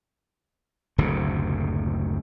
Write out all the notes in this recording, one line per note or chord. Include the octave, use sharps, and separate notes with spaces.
F#1 D2 A2 C3